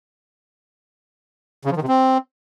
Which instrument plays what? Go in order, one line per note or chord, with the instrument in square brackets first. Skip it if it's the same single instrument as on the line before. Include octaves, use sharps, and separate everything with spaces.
[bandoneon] C#3
F3
D#3
C3
C4